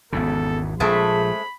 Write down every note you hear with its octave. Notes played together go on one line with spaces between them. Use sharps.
G#1 E2 C#3 B3 A4
A#1 G#3 A3 C4 G#4 B5